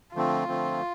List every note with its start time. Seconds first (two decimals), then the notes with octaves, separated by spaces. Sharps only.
0.15 D3 F3 A3 C4 F4
0.48 D3 F3 A3 C4